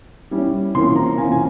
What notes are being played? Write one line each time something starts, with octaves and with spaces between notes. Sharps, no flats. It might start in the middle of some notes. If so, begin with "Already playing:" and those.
G3 C#4 E4
C3 E3 A#3 C#4 F4 C6
A#5
C3 E3 A#3 C#4 F4 G#5
G#5